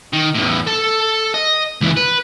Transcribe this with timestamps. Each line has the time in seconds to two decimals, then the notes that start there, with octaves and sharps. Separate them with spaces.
0.13 D#3
0.35 E2 A2
0.67 A4 A5
1.34 D#5
1.81 C#2 E3
1.97 B4